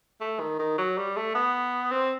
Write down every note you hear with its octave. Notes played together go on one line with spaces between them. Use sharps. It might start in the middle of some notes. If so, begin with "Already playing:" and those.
A3
D#3
D#3
F#3
G3
A3
B3
C4